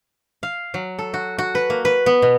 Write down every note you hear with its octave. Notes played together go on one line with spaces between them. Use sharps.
F5
F#3
A4
F#4
F#4
B4
A#3
B4
B3
B2